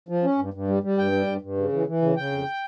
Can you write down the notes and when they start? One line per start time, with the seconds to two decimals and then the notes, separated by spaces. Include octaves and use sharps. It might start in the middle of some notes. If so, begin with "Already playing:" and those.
0.09 F3
0.23 C#4
0.38 G2
0.54 G2
0.68 G3
0.83 G3
0.98 G2 G5
1.12 G3
1.27 G2
1.42 G2
1.57 C#3
1.72 E3
1.87 E3
2.02 C#3
2.16 C#3 G5
2.32 F2